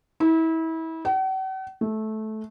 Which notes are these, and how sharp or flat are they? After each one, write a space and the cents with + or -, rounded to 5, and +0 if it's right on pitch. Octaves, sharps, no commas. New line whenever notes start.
E4 -30
F#5 +45
A3 -15